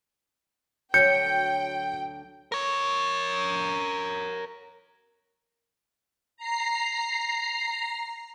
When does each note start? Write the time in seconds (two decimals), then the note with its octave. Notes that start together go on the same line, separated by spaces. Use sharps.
0.94 D2 D3 F#3 G5 G6 C#7
2.52 A#4 C#5
6.37 A#5 C7